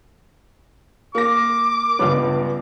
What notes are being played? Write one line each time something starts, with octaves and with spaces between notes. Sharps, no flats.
A#3 D6 A#6
C#2 G2 B3